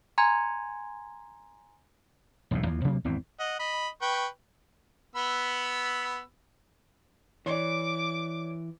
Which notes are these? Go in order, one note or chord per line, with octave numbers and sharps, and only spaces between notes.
G#5 A#5 C6 G#6
E1 B1 A2
D#2 E3 F3
D2 C3 F#3 A#3
G#1 E2 E3 C4
D#5 F#5
D#5 B5
B4 G5 C#6
B3 B5 E6
E3 C#5 D5 D6